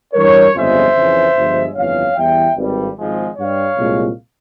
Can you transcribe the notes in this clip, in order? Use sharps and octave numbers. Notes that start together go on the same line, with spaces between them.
G2 E3 G3 A#4 C#5
G1 F2 C#3 F3 G#3 C5 E5
F2 C#3 E3
G1 G2 F3 G#3
G1 F2 E3 C#5 F5
E2 E3 G3 E5 G5
G#1 G2 G3
G#1 G#2 F3 G#3
G2 G3 C#5 F5
C2 A#2 G#3